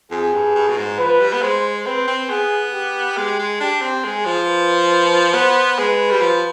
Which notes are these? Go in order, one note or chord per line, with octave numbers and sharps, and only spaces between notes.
F2 G#4
G2
G2
B2
G#2
F3 B4
G3
B3
G#3 C5
C4 B4
C4
B3 G#4
G4
G#3
G#3
D4 G4
C4
G#3 G#4
F3
B4
B4
B3 C5
G#3 B4
G3
F3